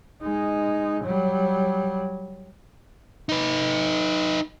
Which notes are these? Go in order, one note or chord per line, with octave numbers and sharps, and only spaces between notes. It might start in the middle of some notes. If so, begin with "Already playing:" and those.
G#3 D#4
F#3 G3
D#4 B4